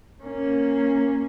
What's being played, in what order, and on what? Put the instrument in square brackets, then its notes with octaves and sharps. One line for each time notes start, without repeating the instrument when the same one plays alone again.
[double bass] A#3 C#4